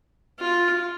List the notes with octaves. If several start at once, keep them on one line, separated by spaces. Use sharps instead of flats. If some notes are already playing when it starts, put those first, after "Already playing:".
F4